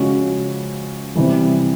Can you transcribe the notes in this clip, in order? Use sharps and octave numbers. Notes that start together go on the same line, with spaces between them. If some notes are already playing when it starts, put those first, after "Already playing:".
Already playing: C#3 F3 G#3 C#4 F#4
C3 E3 G3